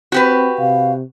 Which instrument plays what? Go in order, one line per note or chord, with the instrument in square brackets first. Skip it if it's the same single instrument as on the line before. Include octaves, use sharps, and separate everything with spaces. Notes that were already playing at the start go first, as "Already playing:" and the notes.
[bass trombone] C4 [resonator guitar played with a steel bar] F#4 G4 B4
[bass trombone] C3 [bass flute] F5